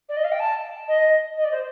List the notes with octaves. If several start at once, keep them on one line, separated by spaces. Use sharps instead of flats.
D5
D#5
F5
G5
A5
D#5
D#5
D5
C5